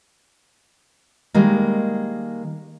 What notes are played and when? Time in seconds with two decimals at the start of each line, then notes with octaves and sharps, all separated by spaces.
1.34 D#3 G3 G#3 A#3